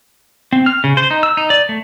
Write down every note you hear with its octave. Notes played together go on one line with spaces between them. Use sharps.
C4
F6
C#3
C5
D#4
E6
D#4
D5
A3